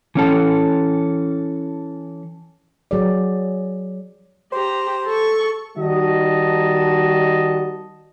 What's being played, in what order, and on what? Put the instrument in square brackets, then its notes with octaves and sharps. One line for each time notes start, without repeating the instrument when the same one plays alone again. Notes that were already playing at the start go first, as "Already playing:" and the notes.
[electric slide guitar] E3 C#4 A4
[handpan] F#3 G#4 D5
[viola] G4 A#5 [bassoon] C5
[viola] A4 C#6
[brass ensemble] D#3 G3 D#4 F#4 D#5 A5